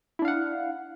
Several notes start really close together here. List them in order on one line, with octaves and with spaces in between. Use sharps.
E4 D4 F5 F#5